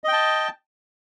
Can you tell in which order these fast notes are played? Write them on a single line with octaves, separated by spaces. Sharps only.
D#5 G5 A5